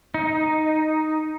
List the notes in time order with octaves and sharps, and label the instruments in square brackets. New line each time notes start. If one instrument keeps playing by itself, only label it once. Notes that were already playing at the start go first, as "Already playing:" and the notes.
[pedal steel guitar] D#4